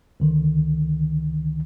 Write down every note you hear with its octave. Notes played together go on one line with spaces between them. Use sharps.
C#2 D3 D#3